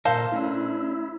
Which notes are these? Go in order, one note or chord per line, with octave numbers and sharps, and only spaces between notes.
A#2 A4 A#4 C5 F5
A3 C#4 D4 E4